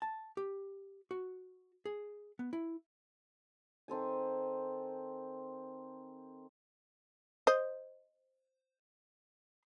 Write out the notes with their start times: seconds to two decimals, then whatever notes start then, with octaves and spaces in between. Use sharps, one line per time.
0.02 A5
0.37 G4
1.11 F#4
1.86 G#4
2.39 B3
2.53 E4
3.88 D#3 C4 A4 G#5
7.47 C5 D#5